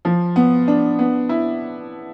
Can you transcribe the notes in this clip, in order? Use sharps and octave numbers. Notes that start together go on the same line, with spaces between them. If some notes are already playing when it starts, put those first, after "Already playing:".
F3
B3
D4
B3
E4